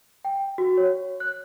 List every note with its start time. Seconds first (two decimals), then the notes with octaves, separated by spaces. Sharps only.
0.25 G5
0.58 F#4
0.77 C#5
1.20 F#6